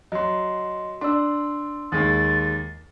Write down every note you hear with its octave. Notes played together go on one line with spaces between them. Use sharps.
F#3 D#5 C6
D4 C6 E6
D#2 G#3 A6